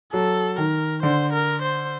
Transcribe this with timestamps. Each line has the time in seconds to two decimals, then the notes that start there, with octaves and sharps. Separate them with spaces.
0.13 F#3 A4
0.58 D#3 A#4
1.02 D3 C5
1.33 A#4
1.62 C5